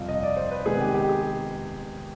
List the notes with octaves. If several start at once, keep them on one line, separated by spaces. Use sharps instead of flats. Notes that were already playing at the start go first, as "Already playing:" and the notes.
Already playing: F2 C3 G3 F5
D#5
D5
C5
B4
C3 D#3 G#3 B3 G#4
G4
G4
G#4